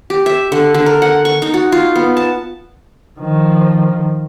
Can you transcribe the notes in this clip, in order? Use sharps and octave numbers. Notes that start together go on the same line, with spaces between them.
G4
E5
D3
D3
A#4
F#5
C#6
D#4
F#4
F4
B3
A5
D#3 F3